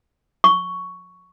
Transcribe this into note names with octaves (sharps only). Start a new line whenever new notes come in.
C#6